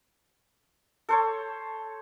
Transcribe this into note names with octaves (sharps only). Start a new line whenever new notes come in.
A4 C5 C#5